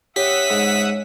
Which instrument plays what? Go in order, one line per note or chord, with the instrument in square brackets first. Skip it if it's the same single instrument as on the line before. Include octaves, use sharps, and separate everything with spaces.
[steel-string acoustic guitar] C#4 [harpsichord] G4 [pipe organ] E5 F#5 D#6 [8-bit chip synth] B6
[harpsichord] G#2